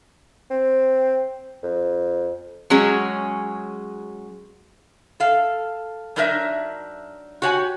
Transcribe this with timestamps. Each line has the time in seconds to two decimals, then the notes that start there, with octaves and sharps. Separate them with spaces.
0.50 C4
1.63 F2
2.70 F#3 G#3 C#4 G#4
5.20 A4 F5
6.16 F#3 D4 D#4 A#4 C#5 E5
7.42 F#4 G4 C#5 F#5 G#5